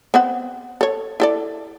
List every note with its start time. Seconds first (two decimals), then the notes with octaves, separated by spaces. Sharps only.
0.14 B3 C4 F#5
0.81 A4 C#5
1.20 E4 A4 D5